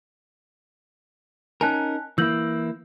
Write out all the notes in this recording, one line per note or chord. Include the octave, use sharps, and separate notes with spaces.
C#4 D#4 A#4 G#5 A5 F#6
E3 A#3 E4 E6 G6 F#7